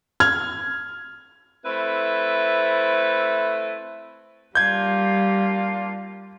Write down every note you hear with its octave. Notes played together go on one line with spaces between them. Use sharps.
F6 G#6
A3 C4 E4 B4 E5
G3 A#3 D4 F4 G6 G#6